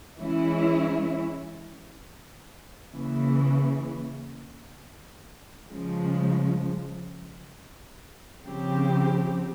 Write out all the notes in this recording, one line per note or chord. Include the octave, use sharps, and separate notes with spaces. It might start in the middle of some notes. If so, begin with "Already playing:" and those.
E3 G#3 C#4 E4
C#3 E3 A#3
C#3 F3 G#3
C#3 F3 C4 G4